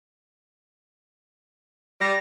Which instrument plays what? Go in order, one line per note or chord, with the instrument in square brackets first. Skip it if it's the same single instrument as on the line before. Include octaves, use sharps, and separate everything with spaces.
[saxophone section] G3 [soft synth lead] A#6